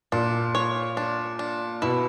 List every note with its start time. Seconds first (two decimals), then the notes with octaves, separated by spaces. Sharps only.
0.12 A#2 D4
0.55 C#5
0.97 D4
1.39 D4
1.82 B2 E4